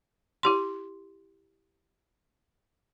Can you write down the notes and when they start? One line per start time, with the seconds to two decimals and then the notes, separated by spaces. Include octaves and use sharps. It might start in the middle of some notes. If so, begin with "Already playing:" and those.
0.43 E4 G4 C6